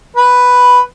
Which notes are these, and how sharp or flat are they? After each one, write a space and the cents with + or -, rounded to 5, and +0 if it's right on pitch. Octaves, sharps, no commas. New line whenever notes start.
B4 +0